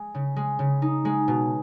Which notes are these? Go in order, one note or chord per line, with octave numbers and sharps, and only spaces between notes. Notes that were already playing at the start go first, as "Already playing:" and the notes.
Already playing: G#3
C#3
G#3
C#3
D#4
G#3
B2